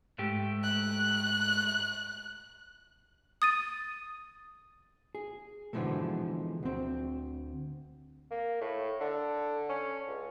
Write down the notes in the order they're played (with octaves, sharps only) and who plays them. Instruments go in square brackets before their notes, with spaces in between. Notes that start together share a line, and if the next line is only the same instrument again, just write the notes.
[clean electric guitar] G#2 A3 G4
[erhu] F#6
[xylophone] D#6 A6 D#7
[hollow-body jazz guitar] G#4
B2 D3 E3 F3 G#3 A3
D2 C4
[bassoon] A#3
A2
D3
C#4
C#2